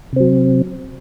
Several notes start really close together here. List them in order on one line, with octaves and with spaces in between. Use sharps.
C3 C4 F#3